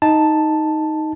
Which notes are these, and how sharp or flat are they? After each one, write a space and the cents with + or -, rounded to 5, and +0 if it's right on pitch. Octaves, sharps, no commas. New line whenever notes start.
D#4 +5 A5 +0